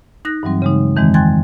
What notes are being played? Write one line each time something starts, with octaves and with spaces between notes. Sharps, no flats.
D#4 F#6 A#6
G2 E3 F#3 G3 C4
C#3 G#3 D#4
F2 D#3 E3 G#3 C4
G5 G#5 C6 F#6 G#6 A6